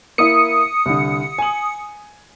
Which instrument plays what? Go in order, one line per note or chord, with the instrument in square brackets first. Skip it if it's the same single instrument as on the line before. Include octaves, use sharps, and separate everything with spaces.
[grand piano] A#3 E4 [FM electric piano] D#6 C#7
[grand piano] C2 D3
G#5 F#7